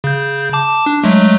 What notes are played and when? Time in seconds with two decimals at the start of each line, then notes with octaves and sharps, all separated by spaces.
0.04 C#3 G6
0.53 A5 D6
0.86 D4
1.04 F#3 G#3 A3